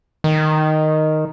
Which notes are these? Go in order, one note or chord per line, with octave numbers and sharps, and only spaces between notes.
D#3